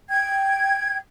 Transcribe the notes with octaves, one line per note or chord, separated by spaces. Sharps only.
G5 G#6